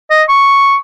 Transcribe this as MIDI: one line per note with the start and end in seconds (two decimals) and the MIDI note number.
0.10 0.23 75
0.28 0.76 85